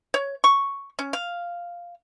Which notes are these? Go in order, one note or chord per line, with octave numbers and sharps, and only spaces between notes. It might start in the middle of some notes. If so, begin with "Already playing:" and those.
C#5
C#6
C#4
F5